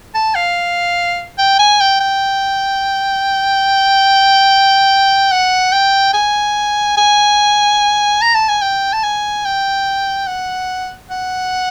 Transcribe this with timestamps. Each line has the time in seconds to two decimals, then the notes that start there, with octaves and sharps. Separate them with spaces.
0.15 A5
0.35 F5
1.38 G5
1.59 G#5
1.80 G5
2.00 G5
5.32 F#5
5.72 G5
6.14 G#5
6.97 G#5
8.22 A#5
8.35 A5
8.49 G#5
8.62 G5
8.93 A5
9.03 G#5
9.45 G5
10.27 F#5
11.10 F#5